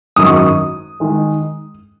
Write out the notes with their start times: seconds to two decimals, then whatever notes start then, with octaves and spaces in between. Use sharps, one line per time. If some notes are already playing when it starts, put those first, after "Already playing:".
0.16 G#1 F#2 F#3 D#6
0.26 C#6
0.36 D#6
1.00 D#3 G#3